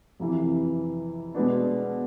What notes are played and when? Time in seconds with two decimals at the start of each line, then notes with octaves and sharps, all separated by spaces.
0.20 F2 C3 E3
1.35 B2 G#3 B3 D4